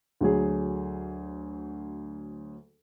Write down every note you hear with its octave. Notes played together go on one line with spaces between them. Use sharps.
D2 F#3 G#4